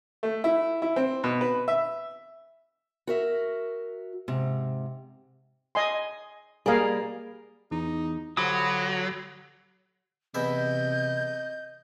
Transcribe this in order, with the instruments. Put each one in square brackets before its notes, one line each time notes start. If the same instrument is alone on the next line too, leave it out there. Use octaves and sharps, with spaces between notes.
[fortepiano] A3
E4
E4
C4
B2
B4
E5
[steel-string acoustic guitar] F#4 A#4 E5
G#2 C3
[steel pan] D#5 G#5 C6
[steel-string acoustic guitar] G3 A#3 [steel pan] G#4 A#4 F5
[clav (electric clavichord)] E2 [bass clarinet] D#4
[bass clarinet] D3 [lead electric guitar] F#3 [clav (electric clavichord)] F4 G4 C5 [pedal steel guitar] B5 D6 D#6
[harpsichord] E2 E4 E5 [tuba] C3 [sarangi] D#5 [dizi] G6